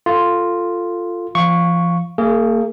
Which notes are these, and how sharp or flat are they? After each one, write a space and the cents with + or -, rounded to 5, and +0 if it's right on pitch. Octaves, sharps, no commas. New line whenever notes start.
F4 +0 A4 +15
F3 -30 F5 +0 C#6 +0
A#3 -35 G#4 +0